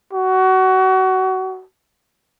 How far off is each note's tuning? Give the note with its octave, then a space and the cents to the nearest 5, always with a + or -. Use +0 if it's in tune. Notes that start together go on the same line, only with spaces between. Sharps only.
F#4 +25